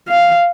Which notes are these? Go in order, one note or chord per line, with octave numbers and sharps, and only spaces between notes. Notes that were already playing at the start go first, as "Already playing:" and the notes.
F5